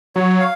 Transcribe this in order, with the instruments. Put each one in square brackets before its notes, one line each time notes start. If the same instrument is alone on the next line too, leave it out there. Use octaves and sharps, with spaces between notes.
[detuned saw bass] F#3 [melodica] C#5
[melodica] F5